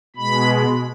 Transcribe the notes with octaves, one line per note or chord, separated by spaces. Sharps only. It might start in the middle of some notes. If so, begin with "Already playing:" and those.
B2 G#3 B5